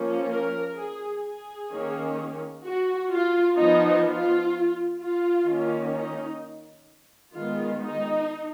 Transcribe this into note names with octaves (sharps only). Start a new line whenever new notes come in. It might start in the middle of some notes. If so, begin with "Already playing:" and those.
Already playing: F3 A#3 C#4
A#4
G#4
G#4
D#3 A#3 C#4
F#4
F4
F3 B3 D#4
F4
F4
D#3 A#3 C#4
D#4
D#3 G#3 B3 F4
D#4